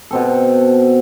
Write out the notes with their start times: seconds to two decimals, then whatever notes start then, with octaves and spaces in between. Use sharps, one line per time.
0.11 B2 C4 A4